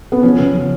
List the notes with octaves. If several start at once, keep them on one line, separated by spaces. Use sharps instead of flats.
B3
F3 C#4
C#3
F3